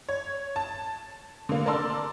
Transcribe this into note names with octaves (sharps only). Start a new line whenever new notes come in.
C#5
A5
D3 A#3
A#4 D5 A5 C6 E6